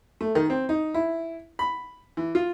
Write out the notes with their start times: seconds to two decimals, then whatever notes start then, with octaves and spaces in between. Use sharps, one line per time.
0.21 A3
0.35 D#3
0.50 C4
0.69 D#4
0.94 E4
1.59 B5
2.17 E3
2.35 F4